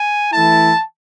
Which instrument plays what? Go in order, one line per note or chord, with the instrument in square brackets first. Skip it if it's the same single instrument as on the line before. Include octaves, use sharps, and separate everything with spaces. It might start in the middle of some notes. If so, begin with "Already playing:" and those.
Already playing: [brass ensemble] G#5
E3 A3 E4 A5